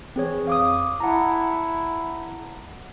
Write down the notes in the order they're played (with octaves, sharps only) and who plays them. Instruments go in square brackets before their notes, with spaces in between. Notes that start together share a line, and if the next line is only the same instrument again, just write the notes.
[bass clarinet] E3 [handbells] C4 G#4 C#5
[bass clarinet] F2 [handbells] F5 D6 D#6
[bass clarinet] E4 [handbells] F#5 A5 A#5